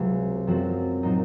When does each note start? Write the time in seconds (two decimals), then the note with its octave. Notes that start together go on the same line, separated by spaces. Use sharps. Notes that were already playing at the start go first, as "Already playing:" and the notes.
Already playing: C#2 C3 F#3
0.47 F#2 F3 C4 F#4
1.03 A#2 F#3 C4 D#4